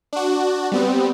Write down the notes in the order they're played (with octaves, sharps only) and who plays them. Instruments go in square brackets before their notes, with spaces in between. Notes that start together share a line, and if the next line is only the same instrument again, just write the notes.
[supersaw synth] D4 F#4
G3 B3 C4